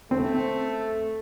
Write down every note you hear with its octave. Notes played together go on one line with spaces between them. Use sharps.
A3 C4